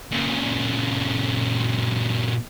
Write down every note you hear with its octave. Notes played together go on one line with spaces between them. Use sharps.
A#2 C#3